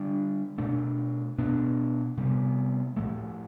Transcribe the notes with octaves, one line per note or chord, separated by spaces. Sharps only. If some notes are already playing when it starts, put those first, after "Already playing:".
Already playing: D3 G3 D4
B2 A3 D4
B2 B3 D4
C3 G3 B3
A2 F3 A3